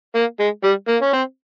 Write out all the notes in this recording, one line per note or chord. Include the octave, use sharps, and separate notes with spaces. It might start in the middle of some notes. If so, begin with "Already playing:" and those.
A#3
G#3
G3
A#3
C#4
C4